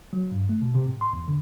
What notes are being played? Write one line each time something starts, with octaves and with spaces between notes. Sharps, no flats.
F#3
G2
A3
B2
C3
A2
C6
E2
D3